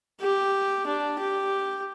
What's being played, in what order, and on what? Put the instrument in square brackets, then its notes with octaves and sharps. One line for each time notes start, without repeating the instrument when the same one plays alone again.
[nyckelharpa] G4
D4
G4